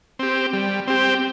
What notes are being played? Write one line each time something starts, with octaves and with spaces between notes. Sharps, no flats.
C4 G4
G3
C4 G4